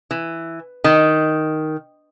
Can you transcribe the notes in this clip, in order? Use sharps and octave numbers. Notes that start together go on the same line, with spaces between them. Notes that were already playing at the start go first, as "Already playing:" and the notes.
E3
D#3